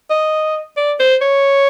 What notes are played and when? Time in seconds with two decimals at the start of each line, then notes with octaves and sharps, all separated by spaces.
0.10 D#5
0.77 D5
1.00 C5
1.22 C#5